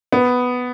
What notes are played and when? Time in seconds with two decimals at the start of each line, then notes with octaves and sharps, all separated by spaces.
0.12 B3